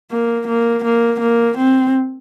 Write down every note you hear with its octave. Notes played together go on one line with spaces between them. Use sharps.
A#3
A#3
A#3
A#3
C4